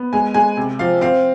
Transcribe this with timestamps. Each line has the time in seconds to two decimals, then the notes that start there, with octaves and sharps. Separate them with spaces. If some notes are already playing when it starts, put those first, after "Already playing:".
Already playing: B3
0.13 G#3 G#5
0.34 G#3 G#5
0.57 C3
0.79 F3 F5
1.01 C4 F5